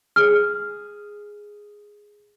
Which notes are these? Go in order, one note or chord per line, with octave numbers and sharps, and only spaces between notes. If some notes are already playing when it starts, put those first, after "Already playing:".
G#4 F6